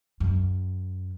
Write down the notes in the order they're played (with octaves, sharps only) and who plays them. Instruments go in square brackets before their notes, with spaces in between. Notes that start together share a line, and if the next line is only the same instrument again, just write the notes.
[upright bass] F#2